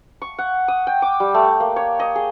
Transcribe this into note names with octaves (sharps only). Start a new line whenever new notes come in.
C#6
F#5
D#6
G5
D6
G3
A3
A#3
C#5
D#5
G#4